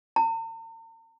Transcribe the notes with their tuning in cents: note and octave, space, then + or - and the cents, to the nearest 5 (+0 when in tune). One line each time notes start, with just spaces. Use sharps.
A#5 -45